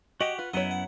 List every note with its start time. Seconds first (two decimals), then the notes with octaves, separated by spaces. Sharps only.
0.21 F#4 G4 C#5 D#5 F#5 G5
0.39 F4 B4
0.53 F#2 F#3 B3 E4 C#5 D#5 F#5
0.71 F#5